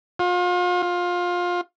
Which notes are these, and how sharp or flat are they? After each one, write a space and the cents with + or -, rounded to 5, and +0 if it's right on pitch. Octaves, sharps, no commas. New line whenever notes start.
F4 +35
F4 +20